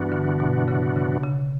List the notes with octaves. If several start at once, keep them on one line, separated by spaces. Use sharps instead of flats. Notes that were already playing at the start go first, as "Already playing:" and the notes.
Already playing: G2 E3 B3 D4 F#4
D3
B2
C#3
C#3
C#3